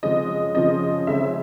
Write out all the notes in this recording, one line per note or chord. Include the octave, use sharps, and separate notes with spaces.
F#2 C#3 F3 G#3 C4 D#5
F#2 C#3 F3 G#3 C4 D#5
F#2 C#3 F3 G#3 C4 E5